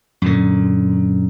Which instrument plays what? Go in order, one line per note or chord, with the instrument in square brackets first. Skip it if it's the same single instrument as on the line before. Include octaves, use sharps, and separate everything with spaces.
[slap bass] F#2 A#2 D3